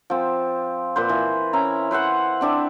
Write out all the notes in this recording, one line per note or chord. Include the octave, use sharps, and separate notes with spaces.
F3 C4
A#2 B4 C5
E3
C#4 E4 A#5
B4 C5 E5 F#5
C4 D4 E5